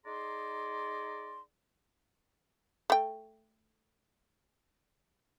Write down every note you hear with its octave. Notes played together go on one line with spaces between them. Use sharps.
D#4 G#4 D5 A#5 C6
A3 G5